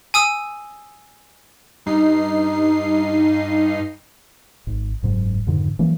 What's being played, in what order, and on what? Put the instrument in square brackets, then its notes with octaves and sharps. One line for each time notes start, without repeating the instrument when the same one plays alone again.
[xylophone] G#5 D#6 E6
[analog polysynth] G2 D#4 C7
[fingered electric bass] G#1
F#1 G#2 F#3
F2 G#2 D3 D#3
E3 F#3 A#3